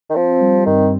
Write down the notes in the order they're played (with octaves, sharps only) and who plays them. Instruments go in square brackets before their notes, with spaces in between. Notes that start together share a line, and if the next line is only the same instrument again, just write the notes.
[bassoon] D#3
[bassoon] F3 [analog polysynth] C4
[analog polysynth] G3
[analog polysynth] G2 [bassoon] D#3